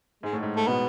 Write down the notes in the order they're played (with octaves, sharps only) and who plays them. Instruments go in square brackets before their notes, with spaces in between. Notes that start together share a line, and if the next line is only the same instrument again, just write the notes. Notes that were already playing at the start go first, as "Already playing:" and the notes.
[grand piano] G#2 [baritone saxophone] G#3
[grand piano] A2
G#2
[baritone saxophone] A3
[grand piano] B2 [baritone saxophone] B3